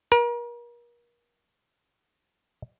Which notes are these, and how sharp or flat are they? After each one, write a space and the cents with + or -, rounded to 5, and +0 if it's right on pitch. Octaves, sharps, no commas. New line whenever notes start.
A#4 +40